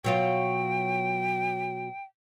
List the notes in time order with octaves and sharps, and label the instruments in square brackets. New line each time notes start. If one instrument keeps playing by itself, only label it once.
[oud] B2 F#3 F4 [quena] G5